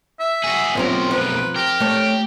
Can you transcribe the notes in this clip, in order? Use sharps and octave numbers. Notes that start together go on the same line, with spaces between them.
E5
F#4 G#4
B1 F3 C4 C#4 A#4
F3 B4
G4 A#4
A3 C#5